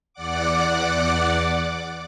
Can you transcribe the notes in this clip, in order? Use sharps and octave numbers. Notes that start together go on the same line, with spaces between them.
E2 D5 F#5 D6